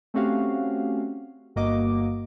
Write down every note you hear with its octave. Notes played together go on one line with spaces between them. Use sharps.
A3 C4 C#4 F#4 G4 F5
G1 G2 A#3 F#4 D#5 D6